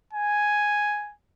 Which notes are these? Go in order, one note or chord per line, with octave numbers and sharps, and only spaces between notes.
G#5